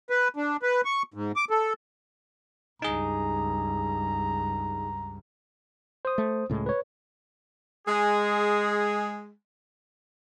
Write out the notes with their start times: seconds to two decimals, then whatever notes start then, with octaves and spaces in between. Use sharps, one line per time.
0.10 B4
0.36 D4
0.62 B4
0.85 C#6
1.14 G#2
1.36 D6
1.50 A4
2.82 C#2 G2 D#4 G#4 A#5
6.05 C5 D#6
6.18 A3
6.49 C#2 A2 G#3
6.66 B4 C#5
7.87 G#3 G#4